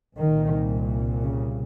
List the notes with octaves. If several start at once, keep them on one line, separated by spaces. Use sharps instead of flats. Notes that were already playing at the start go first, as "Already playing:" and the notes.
C2 A#2 D#3
C#3